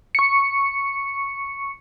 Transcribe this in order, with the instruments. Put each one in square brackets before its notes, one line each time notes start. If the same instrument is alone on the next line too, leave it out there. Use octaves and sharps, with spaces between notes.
[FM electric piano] C#6 C#7